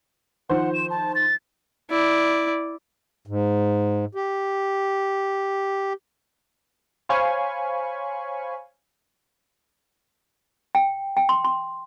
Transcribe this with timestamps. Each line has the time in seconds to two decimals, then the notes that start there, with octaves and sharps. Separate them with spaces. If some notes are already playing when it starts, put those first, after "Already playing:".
0.50 D#3 F3 C5 F#5
0.74 E7
0.90 A5
1.15 A6
1.90 E4 D5
3.27 G#2
4.15 G4
7.09 C5 C#5 F5 G#5 B5 C#6
10.75 G5
11.17 G5
11.29 C6
11.44 C6